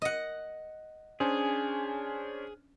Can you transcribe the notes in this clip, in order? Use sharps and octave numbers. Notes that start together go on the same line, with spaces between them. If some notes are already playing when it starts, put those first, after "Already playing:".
D#5 F#5
C#4 D4 G#4 C5